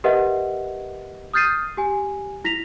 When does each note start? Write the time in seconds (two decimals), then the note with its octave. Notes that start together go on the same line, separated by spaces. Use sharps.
0.04 G4 A#4 B4 D#5 E5 F#5
1.34 D#6 F6 G6 A6 C7 D#7
1.77 G4 G#5
2.44 E4 A#6 B6 F7